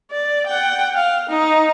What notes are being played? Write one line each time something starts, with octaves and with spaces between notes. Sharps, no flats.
D5
F#5 G5
F5
D#4